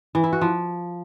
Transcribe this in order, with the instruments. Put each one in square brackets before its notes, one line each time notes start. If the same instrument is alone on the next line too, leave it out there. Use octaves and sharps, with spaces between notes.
[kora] E3
E4
F#4
F3